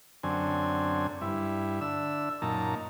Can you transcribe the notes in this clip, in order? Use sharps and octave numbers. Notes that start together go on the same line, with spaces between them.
F#2 D3 C4 G#5
G2 E4
D3 E5 E6
F#2 A#2 D#4 A5 A#5